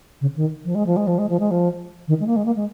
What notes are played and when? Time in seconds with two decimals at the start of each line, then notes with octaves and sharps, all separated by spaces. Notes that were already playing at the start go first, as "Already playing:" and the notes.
0.21 C#3
0.36 D#3
0.64 F3
0.74 G#3
0.86 F3
0.96 G#3
1.07 F3
1.18 G#3
1.29 F3
1.39 G#3
1.50 F3
2.07 D#3
2.19 G#3
2.26 A#3
2.36 G#3
2.45 A#3
2.55 G#3